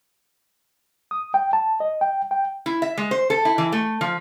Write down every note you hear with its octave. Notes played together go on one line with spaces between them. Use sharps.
D#6
G5
A5
D#5
G5
G5
E4
E5
G#3
C5
A4
E4
E3
A3
F3